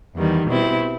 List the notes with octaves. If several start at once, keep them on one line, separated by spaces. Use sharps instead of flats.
E2 D#3 G3
B2 G3 C4 E4